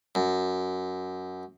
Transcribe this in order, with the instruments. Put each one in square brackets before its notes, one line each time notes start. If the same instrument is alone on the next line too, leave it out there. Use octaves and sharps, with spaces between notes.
[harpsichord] F#2